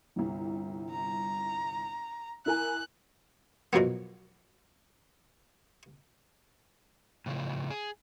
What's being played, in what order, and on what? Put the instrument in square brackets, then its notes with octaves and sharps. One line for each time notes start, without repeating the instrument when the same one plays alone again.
[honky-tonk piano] G1 C2
[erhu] A#5
[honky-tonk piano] E4 A#4 G#5 [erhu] F#6
[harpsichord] B2 F3 F#3 A#3 B3
[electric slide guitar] A2 C#3 F3
G#4